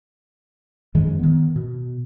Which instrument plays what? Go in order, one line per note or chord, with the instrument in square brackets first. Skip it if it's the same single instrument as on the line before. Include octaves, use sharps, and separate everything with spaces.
[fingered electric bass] F#2 D#3 F3 G#3
D#3 B3
B2